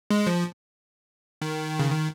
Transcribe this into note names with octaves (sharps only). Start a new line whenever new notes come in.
G#3
F3
D#3
C#3
D#3